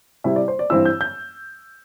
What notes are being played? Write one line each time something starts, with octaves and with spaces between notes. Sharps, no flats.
C3 G3 E4 E5
D5
C5
D5
G2 E3 C4 E4 E6
G6
G6